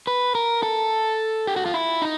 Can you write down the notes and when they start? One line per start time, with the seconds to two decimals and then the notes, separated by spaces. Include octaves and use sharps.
0.07 B4
0.35 A#4
0.63 A4
1.47 G4
1.56 F#4
1.66 F4
1.74 E4
2.02 D#4